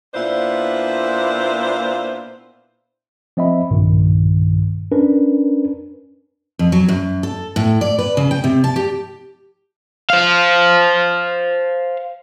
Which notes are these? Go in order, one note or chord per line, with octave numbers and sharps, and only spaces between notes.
A#2 B3 D4 E4 C5 F5
F3 C4 D#5 E5 B5
B1 G2 A#2 D#3
C#4 D4 A#4 B4
F2
F#3
F#2
A4
A2
D5
B4
C#3
G5
C3
A5
G4
C5 F5